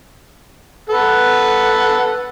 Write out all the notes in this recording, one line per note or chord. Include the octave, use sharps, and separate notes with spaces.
A4 B4 F#5